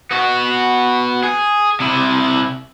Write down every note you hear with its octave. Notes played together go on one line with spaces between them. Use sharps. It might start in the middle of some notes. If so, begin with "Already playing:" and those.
B3 F#4
G#4
C3 E4